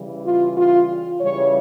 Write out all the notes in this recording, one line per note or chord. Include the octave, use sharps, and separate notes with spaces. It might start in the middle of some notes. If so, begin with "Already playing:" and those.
Already playing: C#3 E3 G3
F4
F4
C#3 E3 G3 C#5